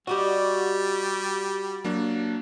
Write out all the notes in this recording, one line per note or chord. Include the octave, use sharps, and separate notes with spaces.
G3 F#4 G4 D5 D#5
F#3 A#3 D4